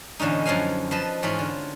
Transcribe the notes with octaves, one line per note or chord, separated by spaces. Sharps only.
E2 A2 D3 C#4 D#4
F#2 D3 F3 F5 G#5
F3 B4 D#5 A5
E2 G#2 C#4 F4 B5
D3